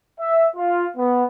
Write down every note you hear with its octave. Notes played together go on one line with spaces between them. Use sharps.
E5
F4
B3